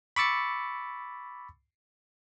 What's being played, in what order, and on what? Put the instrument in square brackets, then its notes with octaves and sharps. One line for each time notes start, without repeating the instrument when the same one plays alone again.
[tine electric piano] B5 C#6 D6 E6 A6 C#7